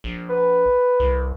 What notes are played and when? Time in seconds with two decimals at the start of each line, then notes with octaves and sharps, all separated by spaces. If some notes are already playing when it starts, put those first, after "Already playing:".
0.04 A#1
0.29 B4
1.00 C2